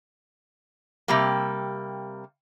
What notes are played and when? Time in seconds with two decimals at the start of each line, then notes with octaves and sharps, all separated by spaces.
1.08 C3 G3 A#3